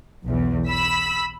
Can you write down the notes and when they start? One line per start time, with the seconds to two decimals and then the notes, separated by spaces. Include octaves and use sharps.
0.24 B1 E2
0.68 B5 E6 B6